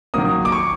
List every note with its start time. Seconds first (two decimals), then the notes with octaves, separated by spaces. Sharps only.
0.14 D#3 F#3 A#3 D#6
0.45 D6
0.52 C#6